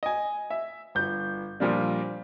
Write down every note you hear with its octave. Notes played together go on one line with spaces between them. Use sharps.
D#5 G#5
E5
G1 G6
A#2 F3 G3 A#3 D4